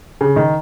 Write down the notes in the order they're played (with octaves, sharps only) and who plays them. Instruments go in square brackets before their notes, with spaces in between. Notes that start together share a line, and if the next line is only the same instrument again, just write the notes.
[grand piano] C#3
D#3